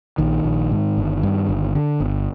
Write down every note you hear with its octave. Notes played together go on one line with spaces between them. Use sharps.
A#1 D#3
A#1
G#2
G1
G2
G1
D3
G1